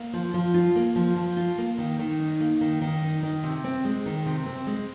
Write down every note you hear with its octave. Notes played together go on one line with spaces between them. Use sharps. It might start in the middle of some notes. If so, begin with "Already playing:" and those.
Already playing: A#3
F3
F3
F4
A#3
F3
F3
F4
A#3
D#3
D#3
D#4
A#3
D#3
D#3
D#4
D#3
C3
C4
G#3
D#3
C3
C4
G#3